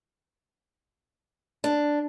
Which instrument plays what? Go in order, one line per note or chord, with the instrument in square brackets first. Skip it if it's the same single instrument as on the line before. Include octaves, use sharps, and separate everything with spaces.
[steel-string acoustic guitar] D4